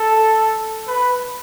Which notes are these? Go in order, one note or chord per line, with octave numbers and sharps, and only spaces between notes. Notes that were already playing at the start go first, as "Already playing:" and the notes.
Already playing: A4
B4